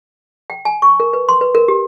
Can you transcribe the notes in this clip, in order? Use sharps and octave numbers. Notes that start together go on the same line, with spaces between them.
G5
G#5
C#6
A#4
B4
C6
B4
A#4
G4